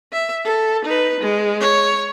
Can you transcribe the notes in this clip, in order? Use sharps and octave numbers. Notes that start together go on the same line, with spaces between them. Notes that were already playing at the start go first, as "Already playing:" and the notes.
E5
A4
D#4 B4
G#3
C#5